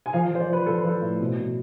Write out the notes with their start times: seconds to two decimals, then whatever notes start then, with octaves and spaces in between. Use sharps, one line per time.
0.06 G#5
0.13 F3 F5
0.31 F3 C5
0.40 D5
0.49 F3 B4
0.66 F3 A4
0.78 B4
0.85 F3 A4
1.02 A2
1.20 B2
1.38 B2